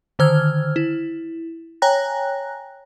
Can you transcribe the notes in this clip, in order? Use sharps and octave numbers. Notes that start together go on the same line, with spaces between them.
D3 D#3 C5 E6 F6 G#6
E4
C#5 G5 G#5 A#5 F#6 A#6